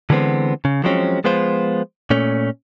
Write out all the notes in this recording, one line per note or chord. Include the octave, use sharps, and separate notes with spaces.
D3 E3 G#3 B3 C4
C#3
F3 F#3 G#3 C4 C#4
F3 G#3 B3 F4 C5
A#2 A3 C#4